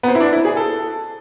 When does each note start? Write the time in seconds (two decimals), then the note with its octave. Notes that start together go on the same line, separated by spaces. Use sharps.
0.03 B3
0.08 C4
0.15 E4
0.20 D4
0.33 E4
0.45 G#4
0.57 A4